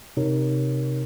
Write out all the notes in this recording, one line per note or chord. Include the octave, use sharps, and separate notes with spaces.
C3 D#4 A#4 C#5